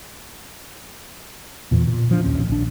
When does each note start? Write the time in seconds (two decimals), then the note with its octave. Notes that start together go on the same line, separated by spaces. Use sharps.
1.71 E2 A#2 E3
1.87 A#2
2.11 F3 D4
2.24 D1 A#1 D#2 C#4
2.48 A#1 D4